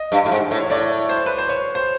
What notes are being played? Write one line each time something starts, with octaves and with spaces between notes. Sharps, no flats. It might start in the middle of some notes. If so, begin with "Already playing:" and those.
Already playing: D#5
G2
A2
G#2
A2
C#5
A2 D5
C5
B4
C5
C#5
C5